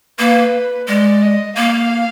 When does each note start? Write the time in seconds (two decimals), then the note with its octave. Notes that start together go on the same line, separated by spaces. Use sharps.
0.19 A#3 B4
0.88 G#3 D5
1.22 D#5
1.57 A#3 F5